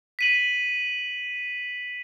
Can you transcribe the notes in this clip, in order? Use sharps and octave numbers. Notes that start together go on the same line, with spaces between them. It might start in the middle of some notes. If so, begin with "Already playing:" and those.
B6 D#7 F#7